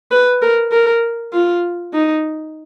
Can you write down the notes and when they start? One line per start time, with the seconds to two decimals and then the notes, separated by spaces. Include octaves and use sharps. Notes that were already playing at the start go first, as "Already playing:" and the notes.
0.11 B4
0.42 A#4
0.72 A#4
1.33 F4
1.93 D#4